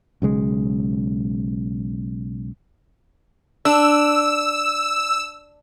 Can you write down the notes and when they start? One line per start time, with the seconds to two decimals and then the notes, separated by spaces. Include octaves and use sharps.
0.22 B1 C#3 G#3
3.65 D4 E6